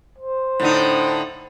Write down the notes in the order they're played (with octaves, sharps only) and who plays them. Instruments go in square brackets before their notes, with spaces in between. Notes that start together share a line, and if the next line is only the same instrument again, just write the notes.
[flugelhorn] C5
[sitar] A2 D3 D#4